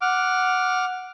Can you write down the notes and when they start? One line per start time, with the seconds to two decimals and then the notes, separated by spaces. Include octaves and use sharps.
0.01 F#5 D6 F6